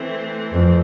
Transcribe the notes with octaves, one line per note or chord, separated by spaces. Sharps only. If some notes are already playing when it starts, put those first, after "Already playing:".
Already playing: E3 A3 C4
F2